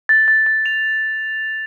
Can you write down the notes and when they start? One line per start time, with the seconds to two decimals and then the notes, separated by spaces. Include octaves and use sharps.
0.09 A6
0.28 A6
0.46 A6
0.66 F7